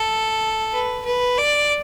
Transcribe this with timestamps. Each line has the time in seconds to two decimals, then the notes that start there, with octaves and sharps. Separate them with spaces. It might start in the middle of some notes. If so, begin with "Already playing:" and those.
Already playing: A4
0.72 B4
1.05 B4
1.38 D5